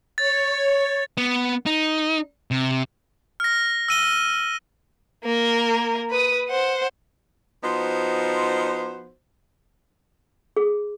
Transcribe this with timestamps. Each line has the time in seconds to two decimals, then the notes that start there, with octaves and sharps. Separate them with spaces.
0.18 C#5 A6
1.17 B3
1.66 D#4
2.51 C3
3.40 F6 A#6
3.88 E6 D#7 G7
5.24 A#3 A#4
6.10 B4 D#6
6.49 C5 F#5
7.63 F3 B3 D#4 F#4 C5
10.56 G#4